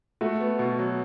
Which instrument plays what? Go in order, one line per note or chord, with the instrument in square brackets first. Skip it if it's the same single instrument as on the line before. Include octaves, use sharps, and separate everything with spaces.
[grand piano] A3 [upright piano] F#4
[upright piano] B3
B2
F#3